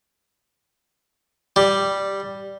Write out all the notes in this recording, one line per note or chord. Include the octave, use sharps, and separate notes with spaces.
G3